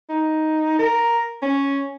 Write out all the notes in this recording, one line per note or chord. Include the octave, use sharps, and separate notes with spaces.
D#4
A#4
C#4